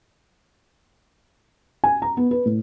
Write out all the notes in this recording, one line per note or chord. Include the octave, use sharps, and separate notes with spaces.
G#5
A#5
B3
B4
A2